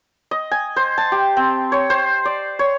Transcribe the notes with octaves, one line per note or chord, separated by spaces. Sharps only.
D#5
G#5
C5
A5
G4
C4
C#5
C5
D5
C#5